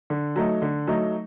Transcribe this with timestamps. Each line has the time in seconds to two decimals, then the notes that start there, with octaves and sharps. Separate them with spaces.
0.10 D3
0.36 F#3 A3 D#4
0.62 D3
0.87 F#3 A3 D#4